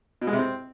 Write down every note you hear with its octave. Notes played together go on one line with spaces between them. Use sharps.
B2
G#3
C3
C4